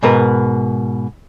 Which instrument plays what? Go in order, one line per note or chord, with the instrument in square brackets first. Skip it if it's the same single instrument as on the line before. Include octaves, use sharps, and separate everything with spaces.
[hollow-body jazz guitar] G#2 B2 A#4 B4